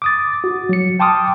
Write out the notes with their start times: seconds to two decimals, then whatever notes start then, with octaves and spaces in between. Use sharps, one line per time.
0.02 D6 D#6 A6
0.44 F#4
0.69 F#3 C#7
1.00 G5 A5 C6 D6 D#6 F6